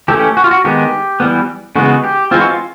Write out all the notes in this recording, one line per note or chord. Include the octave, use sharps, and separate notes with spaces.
E3 A3 C#4 G4
F#4
F4
F#4
D#3 G#3 B3 G4
E3 G3 B3
C#3 E3 G#3 B3 F#4
G4
E3 G#3 C4 F4
F#4
F4